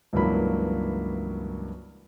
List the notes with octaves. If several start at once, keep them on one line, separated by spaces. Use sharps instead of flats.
C#2 G2 E3 F#3 A#3 B5